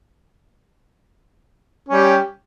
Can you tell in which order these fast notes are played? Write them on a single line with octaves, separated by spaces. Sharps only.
C#4 G3 G4